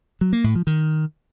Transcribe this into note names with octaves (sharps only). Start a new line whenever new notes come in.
F#3
A#3
A2
F3
D#3